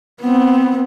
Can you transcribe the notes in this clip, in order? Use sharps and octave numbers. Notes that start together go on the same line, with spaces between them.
B3 C4